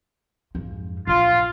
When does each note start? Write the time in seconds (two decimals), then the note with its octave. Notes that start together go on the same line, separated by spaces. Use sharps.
0.55 F2 G#2
1.07 A#1 F4